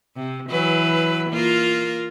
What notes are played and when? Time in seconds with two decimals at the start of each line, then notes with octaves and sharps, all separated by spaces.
0.16 C3
0.50 E3 F#3 B4
1.30 A#3 F4 A#4